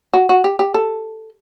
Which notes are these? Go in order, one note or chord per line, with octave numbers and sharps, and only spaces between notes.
F#4
F#4
G4
G4
A4